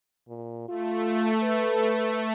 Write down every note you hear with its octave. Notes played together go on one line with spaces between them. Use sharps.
A#2
A3 F4
B4